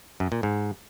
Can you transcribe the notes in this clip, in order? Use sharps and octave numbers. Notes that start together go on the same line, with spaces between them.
F#2
A#2
G#2